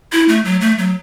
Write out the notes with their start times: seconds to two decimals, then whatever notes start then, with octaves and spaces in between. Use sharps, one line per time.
0.12 E4
0.29 A3
0.45 F#3
0.61 A3
0.78 F#3